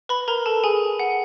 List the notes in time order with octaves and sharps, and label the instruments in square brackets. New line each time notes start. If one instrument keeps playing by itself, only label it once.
[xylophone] B4 B5
A#4 A#5
A4 A5
G#4 G#5
F#5